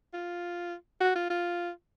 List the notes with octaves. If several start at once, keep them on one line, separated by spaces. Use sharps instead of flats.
F4
F#4
F4
F4